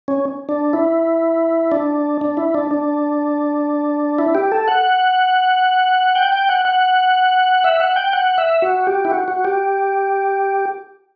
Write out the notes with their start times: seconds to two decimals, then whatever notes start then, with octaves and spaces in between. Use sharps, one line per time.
0.08 C#4
0.49 D4
0.73 E4
1.72 D4
2.21 D4
2.37 E4
2.54 D4
2.71 D4
4.19 E4
4.35 G4
4.52 A4
4.68 F#5
6.15 G5
6.32 G5
6.49 F#5
6.65 F#5
7.64 E5
7.80 F#5
7.96 G5
8.13 F#5
8.38 E5
8.62 F#4
8.87 G4
9.05 E4
9.11 F#4
9.28 F#4
9.45 G4